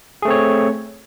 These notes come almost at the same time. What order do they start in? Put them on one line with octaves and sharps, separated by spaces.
G#4 A3 C4 C#5